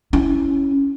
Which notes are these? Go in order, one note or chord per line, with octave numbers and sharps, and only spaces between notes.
C#4 E4